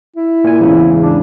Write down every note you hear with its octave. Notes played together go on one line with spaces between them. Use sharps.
E4
A#2 G#5
E2 G#2 C#3
D4